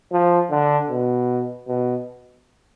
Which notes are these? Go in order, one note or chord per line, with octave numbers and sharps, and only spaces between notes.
F3
D3
B2
B2